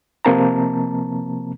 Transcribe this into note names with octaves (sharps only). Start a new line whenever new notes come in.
C3 F3 A#3 C4 A5 A#5